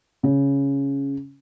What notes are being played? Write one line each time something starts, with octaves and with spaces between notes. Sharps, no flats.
C#3